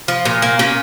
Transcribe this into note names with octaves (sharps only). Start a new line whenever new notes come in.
F3
A#2
A#3
A#2 C#4